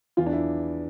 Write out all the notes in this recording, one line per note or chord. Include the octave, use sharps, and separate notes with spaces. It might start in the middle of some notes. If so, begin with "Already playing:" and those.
E2 F4
D4
E4